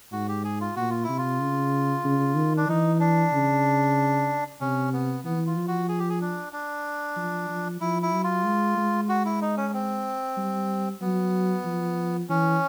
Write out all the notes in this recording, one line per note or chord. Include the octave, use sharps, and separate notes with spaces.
G#2 F#4
G4
G#4
F4
A#2 F#4
F4
C3 E4
F4
C#3
C#3
D#3
D4
E3 D#4
D4
C#3
C3 C#4
B3
E3 B3
F4
F3
F#4
G#4
G4
G#4
D4
D4
F3
F3
F3 E4
E4
F#3
F4
G#3
G#3
F#4
E4
D#4
C#4
C4
G3
F#3 B3
F3
E3 C#4